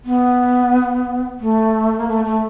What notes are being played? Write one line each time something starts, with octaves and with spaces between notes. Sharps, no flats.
B3
A3
A#3
A3
A3